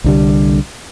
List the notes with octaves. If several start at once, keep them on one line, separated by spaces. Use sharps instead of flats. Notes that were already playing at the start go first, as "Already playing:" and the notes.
C2 D3 G3